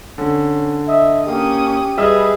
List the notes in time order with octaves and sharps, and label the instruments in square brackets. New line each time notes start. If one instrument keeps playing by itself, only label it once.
[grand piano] D3 [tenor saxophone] C#4
[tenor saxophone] D#5 [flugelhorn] E5
[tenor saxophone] A#3 [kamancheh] C#4 D#6 [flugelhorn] G4
[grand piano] G3 E5 E6 [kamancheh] G#4 B4 [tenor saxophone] D#5